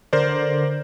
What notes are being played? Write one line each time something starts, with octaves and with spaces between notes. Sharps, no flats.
D3 A#4 C5 D5